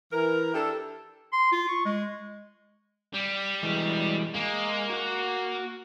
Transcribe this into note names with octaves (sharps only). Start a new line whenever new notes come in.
E3 A#4
D4 E4 G4 A4
C6
F4
C#6
G#3
G3
E3 G#3
G#3 A#3
F#4 F#5